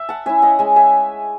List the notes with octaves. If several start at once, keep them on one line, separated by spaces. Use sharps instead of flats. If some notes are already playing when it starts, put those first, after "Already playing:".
Already playing: E5
F#5 A5
C#4 E4 E5 G#5
D#5 F#5
G#3 E5 G#5
E5 G#5